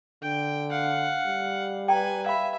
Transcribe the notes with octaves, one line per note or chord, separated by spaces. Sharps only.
D3 G5
F5 F#5
G3
B4 G5 G#5 A#5
E5 F5 B5